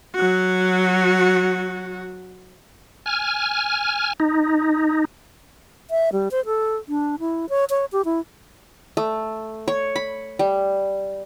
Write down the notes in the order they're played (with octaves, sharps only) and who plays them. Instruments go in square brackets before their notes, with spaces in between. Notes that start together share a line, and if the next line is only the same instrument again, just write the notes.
[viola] F#3 F#4
[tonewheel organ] G#5 F6
D#4
[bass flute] E5
G3
C5
A4
D4
E4
C#5
C#5
G4
E4
[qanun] A3
C#5
B5
G3